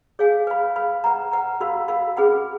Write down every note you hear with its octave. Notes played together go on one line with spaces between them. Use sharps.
G#4 C#5 F5 G#5
B4 F5 B5
B4 F5 B5
B4 F#5 A#5
B4 F#5 A#5
F#4 A#4 F5 B5
F#4 A#4 F5 B5
C#4 G#4 B4 F#5 B5